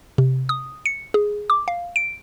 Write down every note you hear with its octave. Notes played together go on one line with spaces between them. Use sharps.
C3
D#6
C#7
G#4
D6
F5
D7